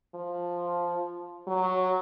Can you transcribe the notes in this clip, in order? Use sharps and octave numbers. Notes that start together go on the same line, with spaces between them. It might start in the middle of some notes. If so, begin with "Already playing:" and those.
F3
F#3